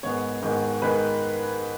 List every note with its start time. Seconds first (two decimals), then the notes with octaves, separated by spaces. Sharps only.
0.03 G#2 D#3 G#3 B3 C#5
0.43 G#2 D#3 G#3 B3
0.82 D#3 G#3 B4